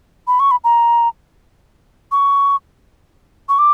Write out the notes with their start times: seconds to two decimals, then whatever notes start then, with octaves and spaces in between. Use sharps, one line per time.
0.27 B5
0.40 C#6
0.51 B5
0.64 A#5
2.12 C#6
3.49 C#6
3.59 D6